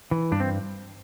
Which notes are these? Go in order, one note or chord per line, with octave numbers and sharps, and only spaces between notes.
E3
G2 D4
C4